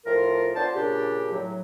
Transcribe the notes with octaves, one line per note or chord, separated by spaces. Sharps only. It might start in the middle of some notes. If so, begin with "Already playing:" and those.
A2 F3 F4 A#4
B3 D4 F4 C5 A5
A#2 C#3 D4 G4
A2 F#3